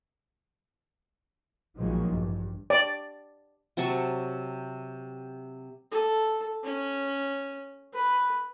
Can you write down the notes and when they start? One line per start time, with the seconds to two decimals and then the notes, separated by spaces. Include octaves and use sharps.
1.77 A#1 A#2 D#3 F3 F#3 G#3
2.08 A1 G2
2.70 D5
3.77 C3 F#3 A5 C#6
5.91 A4
6.64 C#4
7.93 B4